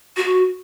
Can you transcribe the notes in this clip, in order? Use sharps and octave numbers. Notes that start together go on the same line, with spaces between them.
F#4